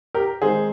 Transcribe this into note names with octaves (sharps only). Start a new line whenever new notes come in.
G4 A#4
D#3 G#3 C4 D#4 G#4 C5